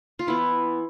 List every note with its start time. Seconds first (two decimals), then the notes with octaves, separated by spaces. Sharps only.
0.19 F4
0.27 E3 B3 E4